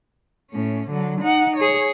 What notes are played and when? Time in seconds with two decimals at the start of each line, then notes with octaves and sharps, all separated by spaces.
0.51 A2 C#4
0.90 D3 F#3
1.22 D#4 F#5
1.57 G#4 C#5